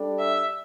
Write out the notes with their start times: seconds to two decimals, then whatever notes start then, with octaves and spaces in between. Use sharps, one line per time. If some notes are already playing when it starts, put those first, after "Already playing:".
Already playing: G3 D4 A4 D5
0.19 E5